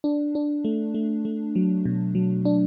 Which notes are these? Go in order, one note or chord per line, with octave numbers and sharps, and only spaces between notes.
D4
D4
A3
A3
A3
F#3
B2
F#3
D4